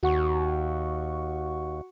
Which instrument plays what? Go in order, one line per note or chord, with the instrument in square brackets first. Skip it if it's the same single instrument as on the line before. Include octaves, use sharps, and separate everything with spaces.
[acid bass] D#2 [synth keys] F#4 F#5 C#6